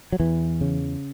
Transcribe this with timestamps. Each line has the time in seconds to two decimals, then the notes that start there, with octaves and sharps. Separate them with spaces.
0.12 F#3
0.20 E2 E3
0.61 C#3